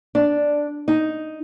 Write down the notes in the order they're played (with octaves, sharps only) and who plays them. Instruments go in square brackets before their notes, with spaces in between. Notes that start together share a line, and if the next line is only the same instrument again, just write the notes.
[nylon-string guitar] D4
D#4